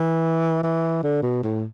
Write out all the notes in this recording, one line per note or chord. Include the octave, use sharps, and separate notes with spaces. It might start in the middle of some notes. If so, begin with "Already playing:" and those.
Already playing: E3
E3
D3
B2
A2